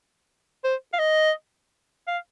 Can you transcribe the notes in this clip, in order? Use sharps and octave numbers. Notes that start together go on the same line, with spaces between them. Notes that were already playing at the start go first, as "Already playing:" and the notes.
C5
F5
D#5
F5